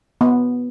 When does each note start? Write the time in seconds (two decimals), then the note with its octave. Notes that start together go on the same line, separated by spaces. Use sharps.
0.21 B3